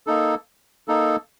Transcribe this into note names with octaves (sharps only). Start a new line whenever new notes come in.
A#3 D#4 A4
A#3 D#4 A4